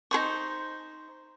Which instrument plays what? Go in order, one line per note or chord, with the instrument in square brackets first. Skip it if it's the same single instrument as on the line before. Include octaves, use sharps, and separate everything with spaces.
[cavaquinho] D#4 G#4 C5 C#6